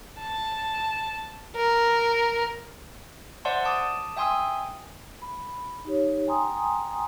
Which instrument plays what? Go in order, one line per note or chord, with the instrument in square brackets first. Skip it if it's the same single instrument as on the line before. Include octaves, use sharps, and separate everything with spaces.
[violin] A5
A#4
[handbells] C5 D5 E5 F#5 A5 C6
A5 D6 D#6
E5 G5 G#5 C6 D#6 E6
[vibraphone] B5
D#4 G4 C#5
G5 G#5 A#5 C6 D#6